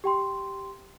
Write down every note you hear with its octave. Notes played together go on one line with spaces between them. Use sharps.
G4 G5 C6